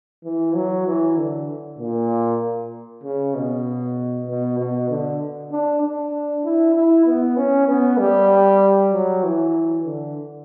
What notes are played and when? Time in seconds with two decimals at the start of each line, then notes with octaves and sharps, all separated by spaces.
0.25 E3
0.55 F#3
0.87 E3
1.17 D3
1.79 A#2
3.04 C#3
3.35 B2
4.27 B2
4.58 B2
4.90 D3
5.52 D4
5.82 D4
6.44 E4
6.75 E4
7.06 B3
7.37 C#4
7.68 B3
7.99 G3
8.92 F#3
9.24 E3
9.86 D3